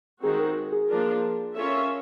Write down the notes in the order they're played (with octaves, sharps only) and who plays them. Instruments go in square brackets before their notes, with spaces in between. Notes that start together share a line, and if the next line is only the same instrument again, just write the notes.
[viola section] D#3 G#3 C4 D#4 F#4 [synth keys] G#4
[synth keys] A#4
G#4
[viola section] F3 A#3 D4 F4 A#4
[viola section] C#4 F4 A#4 C#5 E5 [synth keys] A4